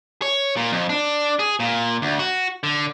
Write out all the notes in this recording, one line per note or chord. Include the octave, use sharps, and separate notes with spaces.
C#5
A#2
F2
D4
G#4
A#2
D2
F#4
D3